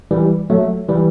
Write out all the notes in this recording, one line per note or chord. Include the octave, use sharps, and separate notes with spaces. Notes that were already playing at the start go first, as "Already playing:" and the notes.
E3 G3
F#3 A3
E3 G3